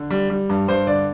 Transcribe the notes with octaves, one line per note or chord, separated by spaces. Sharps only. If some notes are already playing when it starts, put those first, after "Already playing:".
Already playing: D3
G3
G3
G2
G2 C5
D3 D5